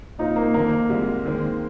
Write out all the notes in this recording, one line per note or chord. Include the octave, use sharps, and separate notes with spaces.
A#2 F3 C4 D#4 F4
A#3
F2 D#3 A#3 C4
C2 C3 G#3 F4
D#2 D#3 G#3 C4